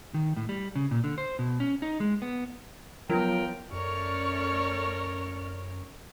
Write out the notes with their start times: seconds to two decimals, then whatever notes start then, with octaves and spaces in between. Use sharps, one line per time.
0.14 D#3
0.36 A2
0.49 G3
0.76 C#3
0.91 A#2
1.04 D3
1.18 C5
1.39 B2
1.60 C#4
1.82 D#4
2.00 G#3
2.22 B3
3.10 F3 F#3 B3 F4 A#4 G5
3.72 F#2 A3 C#4 A#4 C#5 D5 C#6 F6